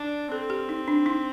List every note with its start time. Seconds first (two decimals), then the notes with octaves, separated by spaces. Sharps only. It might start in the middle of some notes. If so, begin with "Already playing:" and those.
Already playing: D4
0.31 C4 A4
0.50 G4
0.69 D#4
0.88 D4
1.06 D#4